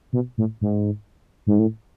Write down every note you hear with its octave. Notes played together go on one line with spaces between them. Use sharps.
B2
A2
G#2
G#2
A2